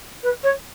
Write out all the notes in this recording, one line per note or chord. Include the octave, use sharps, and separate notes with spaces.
B4
C#5